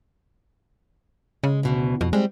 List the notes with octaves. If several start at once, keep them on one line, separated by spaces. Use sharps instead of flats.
C#3 G#3
D2 B2 E3
F2 B2
G3 G#3 C4